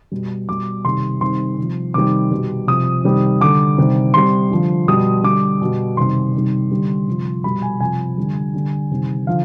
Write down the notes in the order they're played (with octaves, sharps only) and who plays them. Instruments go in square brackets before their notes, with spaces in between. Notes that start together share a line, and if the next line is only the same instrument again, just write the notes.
[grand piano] B2 G3
B2 G3 D6
C3 D#3 G3 C6
C3 D#3 G3 C6
C3
F3
C3 D#3 G3 D6
B2 G3
C3 F3 D#6
C3 D#3 G3
D3 G3 D6
C3 D#3 G3
C3 G3 C6
D3 F3
B2 G3 D#6
D3 G3 D6
B2 G3
C3 D#3 G3 C6
C3 D#3 G3
D3 G3
C3 F3
B2 G3 B5
G#5
C3 F3 G#5
D3 G3
D3 G3
C3 D#3 G3
D3 F3 F5